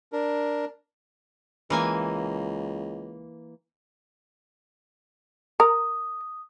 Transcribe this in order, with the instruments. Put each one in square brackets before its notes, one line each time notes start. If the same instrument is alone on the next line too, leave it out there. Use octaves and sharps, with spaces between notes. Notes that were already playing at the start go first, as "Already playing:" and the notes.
[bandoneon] D4 A#4
[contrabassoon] C#2 [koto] E3 A#3 G#5
[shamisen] A#4 [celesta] D#6